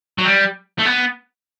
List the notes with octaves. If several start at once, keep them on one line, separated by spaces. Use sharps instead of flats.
F#3
G3
A3
B3